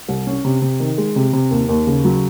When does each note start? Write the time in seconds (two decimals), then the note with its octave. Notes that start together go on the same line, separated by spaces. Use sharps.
0.08 C2
0.27 C#4
0.45 C3
0.62 C3
0.80 D#3
0.98 G#3
1.16 C3
1.33 C3
1.51 D#2
1.69 D#2
1.87 C#3
2.04 F#3